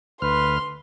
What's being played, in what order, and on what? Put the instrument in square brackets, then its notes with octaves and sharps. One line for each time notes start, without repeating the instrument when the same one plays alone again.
[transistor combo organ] D2 F6 [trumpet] B4 [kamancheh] C6